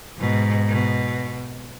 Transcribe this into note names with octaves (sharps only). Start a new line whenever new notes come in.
G#2 B2
B2